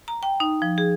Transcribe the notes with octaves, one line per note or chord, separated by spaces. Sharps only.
A#5
G5
D#4
F3
G#4